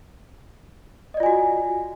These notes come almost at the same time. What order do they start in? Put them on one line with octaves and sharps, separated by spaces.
D#5 D5 F4 G#5 F#4